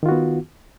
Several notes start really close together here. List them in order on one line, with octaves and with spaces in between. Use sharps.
D#3 F4 F#4 B3